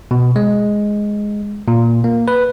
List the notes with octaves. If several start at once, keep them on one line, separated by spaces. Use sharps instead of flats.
B2
G#3
A#2
A#3
B4